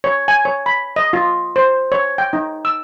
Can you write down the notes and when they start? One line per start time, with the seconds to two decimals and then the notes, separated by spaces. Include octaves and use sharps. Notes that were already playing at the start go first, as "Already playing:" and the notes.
0.04 C#5
0.28 G#5
0.45 C#5
0.66 B5
0.96 D#5
1.13 F4
1.56 C5
1.92 C#5
2.18 G5
2.33 D#4
2.65 E6